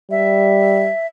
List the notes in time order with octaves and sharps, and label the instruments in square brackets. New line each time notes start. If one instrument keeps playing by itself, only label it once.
[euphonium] G3 [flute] E5